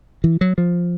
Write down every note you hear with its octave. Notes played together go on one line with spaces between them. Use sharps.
E3
F#3
F3